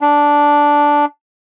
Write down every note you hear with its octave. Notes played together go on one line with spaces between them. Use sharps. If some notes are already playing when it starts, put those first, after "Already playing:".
D4